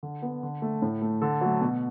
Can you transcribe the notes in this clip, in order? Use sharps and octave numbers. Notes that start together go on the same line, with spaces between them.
D3
B3
D3
A3
A2
A3
D3 A4
F#3 A3
B2